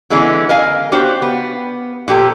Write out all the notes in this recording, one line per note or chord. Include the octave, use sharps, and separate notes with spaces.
D3 E3 G#3 B3 C#4
A#4 D#5 F5 G#5
B3 D4 F#4 G4 C5 C#5
B3
A#2 F3 G4 A4